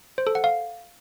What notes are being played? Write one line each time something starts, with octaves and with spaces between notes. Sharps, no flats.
C5
A4
F#5
F5